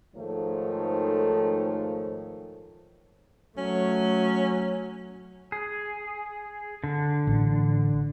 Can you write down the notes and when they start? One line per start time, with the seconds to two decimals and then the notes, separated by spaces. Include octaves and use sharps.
0.16 G#2 D#3 F3 A3 A4 C#5
3.58 F#3 A3 C#4
5.52 G#4
6.84 D3
7.27 A1